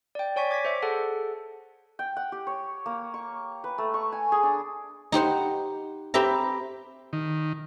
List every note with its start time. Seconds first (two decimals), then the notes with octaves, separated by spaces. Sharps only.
0.15 D5 G5
0.36 C#5 D5 G#5 C#6 B6
0.51 D6 G#6 A#6 B6
0.65 C5 E5 D6
0.82 G#4 A4 F#5 A5
1.99 G5
2.16 F#5
2.32 G4
2.47 C#5
2.86 A#3
3.14 C#6
3.64 B4
3.78 A3
3.94 C#6
4.12 G#5
4.32 G#4
4.43 D4
5.12 D#4 G4 C5 F#5
6.14 C4 G4 B4 E5 A#5
7.13 D#3